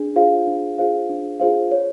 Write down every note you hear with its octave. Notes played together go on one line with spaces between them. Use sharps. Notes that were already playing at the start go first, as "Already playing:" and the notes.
Already playing: D4 G#4
F4 G#4 C5 F5
D4
F4 G#4 C5 F5
D4
F4 G#4 C5 F5
C#5